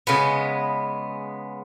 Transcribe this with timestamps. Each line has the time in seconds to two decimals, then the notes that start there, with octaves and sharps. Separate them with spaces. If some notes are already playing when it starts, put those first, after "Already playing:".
0.07 C#3 G#3 B3